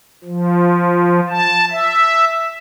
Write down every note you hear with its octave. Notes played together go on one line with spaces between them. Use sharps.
F3
A5
E5